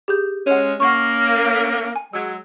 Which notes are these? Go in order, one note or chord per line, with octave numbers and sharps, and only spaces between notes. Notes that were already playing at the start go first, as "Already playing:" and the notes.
G4 G#4 G6
G#3 C#4 C#5 F#5
A#3 C#4 F#5 C#6
G#5
F#3 G#3 E6 G#6